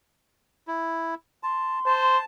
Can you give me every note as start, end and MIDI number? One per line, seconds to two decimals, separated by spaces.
0.68 1.15 64
1.43 1.79 81
1.43 2.19 84
1.86 2.18 72
1.86 2.25 81